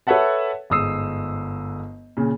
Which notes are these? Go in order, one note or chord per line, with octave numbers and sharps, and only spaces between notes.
A4 B4 C#5 E5 F#5 A5
G1 G#2 D#6 E6 C7
A#2 C#3